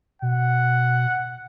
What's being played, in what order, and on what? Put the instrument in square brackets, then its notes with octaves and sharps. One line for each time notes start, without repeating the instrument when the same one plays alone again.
[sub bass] B2 [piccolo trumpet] F#5